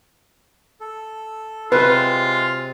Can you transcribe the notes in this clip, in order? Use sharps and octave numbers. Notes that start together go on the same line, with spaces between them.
A4
C3 F#3 G#3 F4 B4